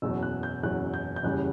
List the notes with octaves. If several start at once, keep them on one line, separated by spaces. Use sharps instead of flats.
F#1 E2 B2 F#3 E6
F#6
G6
F#1 E2 B2 F#3 F#6
G6
G6
F#1 E2 C#3 G3 F#6